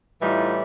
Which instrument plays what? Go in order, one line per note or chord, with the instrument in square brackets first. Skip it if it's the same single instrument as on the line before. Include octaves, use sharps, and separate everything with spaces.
[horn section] A2 E3 G3 D#4 F4